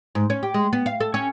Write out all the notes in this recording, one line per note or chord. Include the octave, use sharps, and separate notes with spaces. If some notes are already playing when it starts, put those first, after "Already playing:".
G#2
C#4
G4
G#3
B3
F5
A4
C#4